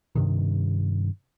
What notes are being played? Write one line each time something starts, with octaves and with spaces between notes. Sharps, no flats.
G2 C3 D#3